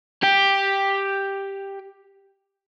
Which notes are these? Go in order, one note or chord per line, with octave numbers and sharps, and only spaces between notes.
G4 G5